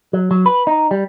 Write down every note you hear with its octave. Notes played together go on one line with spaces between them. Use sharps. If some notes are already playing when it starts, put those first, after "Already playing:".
F#3
F#3
B4
D#4
G3